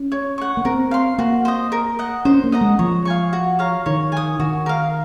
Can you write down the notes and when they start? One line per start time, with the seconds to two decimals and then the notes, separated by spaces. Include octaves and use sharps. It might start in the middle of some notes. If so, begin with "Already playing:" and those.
Already playing: C#4
0.12 C#5
0.38 F#5 C#6
0.57 A#3
0.65 C4 A#4
0.91 F5 C6
1.18 A#3 F#4
1.45 C5 D#5
1.72 A#4
1.99 D#5 F#5
2.25 C#4 C5
2.44 A#3
2.52 D#5 F#5 A#5
2.61 G#3
2.79 F3 C#5
3.05 F5 G#5 C#6
3.33 F#4
3.59 C#5 F5 A#5
3.86 D#3 C#5
4.12 G#5 D#6
4.39 D#3 F#4
4.66 A#4 F5